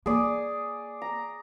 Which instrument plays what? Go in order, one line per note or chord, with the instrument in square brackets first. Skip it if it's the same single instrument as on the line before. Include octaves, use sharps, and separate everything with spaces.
[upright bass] A#3 [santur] G#4 D5
[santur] A#5